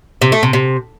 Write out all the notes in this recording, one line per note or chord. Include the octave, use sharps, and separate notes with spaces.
C3
A3
C3
C3